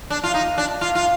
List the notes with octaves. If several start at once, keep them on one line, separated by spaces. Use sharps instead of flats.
D4
F4
D#4
D4
F4
F4